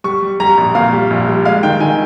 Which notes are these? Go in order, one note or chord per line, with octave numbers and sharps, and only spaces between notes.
G3 C#6
G3
G3 A#5
A#1
A#2 F5
G3
A#1
G3
G#3 F5
D#3 G5
D#3 G#5